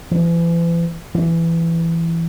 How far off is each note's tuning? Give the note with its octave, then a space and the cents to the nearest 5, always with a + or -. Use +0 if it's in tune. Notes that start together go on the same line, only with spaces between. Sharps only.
E3 +40
E3 +15